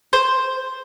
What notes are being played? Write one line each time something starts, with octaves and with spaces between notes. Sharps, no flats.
C5